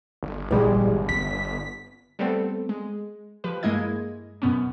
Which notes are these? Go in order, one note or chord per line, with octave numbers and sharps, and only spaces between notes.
G1
A#1 E3 G3 G#3
B3 B6
G3 A3 B3 C4 A4
G#3
F3 G4 B4
G2 G#3 A#3 E4 D#5 G#6
F#2 B2 B3 C#4